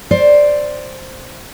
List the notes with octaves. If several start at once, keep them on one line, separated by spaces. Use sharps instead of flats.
C5 D5